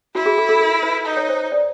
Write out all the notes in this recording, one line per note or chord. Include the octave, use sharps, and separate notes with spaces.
E4 F#4
G#4
A4
A4
A#4
B4
D#4
C#5
C5
D5